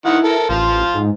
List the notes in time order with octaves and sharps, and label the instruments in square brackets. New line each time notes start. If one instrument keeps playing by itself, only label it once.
[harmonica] D#3 F#5 [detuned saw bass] E4
[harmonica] A4 A#4
[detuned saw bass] A1 [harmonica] F3 F4
[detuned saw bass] G#2